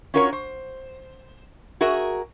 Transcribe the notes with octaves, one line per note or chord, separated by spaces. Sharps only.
C#4 F4 F#4 A#4 C5 C#5
C5
F#4 G#4 A#4 E5